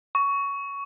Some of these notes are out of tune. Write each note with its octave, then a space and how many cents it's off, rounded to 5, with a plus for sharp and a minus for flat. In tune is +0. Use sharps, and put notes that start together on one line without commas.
C#6 +15